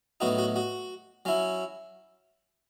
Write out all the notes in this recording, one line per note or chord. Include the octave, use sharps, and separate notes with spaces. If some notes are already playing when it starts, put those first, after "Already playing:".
A2 F#3 B3 D#4 F#4
F#4
F#4
F#3 C#4 E4